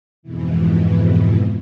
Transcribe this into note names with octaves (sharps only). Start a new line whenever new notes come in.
F2 G#2 B2 E3